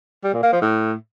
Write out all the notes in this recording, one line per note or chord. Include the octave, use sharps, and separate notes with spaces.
G3
A#2
A#3
F3
A2